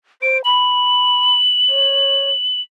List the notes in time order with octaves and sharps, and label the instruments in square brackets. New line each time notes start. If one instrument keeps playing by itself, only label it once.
[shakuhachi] C5 [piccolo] D7
[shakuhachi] B5 [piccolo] F#7
[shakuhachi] C#5